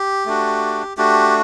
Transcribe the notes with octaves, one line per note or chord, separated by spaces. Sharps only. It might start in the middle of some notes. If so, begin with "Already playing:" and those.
Already playing: G4
A3 D4 F#4
A3 D4 F#4 G4